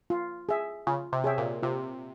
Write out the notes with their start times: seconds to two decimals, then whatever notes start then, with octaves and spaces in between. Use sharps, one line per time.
0.10 F4
0.49 G#4 E5
0.87 C#3 F4
1.13 C3
1.24 G#4 C#5 E5 G5
1.38 A#2
1.63 C3 F4